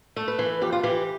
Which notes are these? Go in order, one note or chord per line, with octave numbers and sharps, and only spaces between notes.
A3
B4
E3
F2 G4
F4
E3 G4